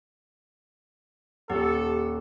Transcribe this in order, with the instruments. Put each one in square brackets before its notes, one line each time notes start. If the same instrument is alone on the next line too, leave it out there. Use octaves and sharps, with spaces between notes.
[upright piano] D#1 [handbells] G4 F#5 [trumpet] A4